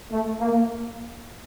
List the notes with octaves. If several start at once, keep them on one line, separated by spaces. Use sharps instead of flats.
A3
A#3